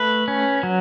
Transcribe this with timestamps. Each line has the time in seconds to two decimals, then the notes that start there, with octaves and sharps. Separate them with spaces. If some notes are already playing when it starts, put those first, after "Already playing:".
Already playing: A3 B4
0.28 C#4
0.63 F#3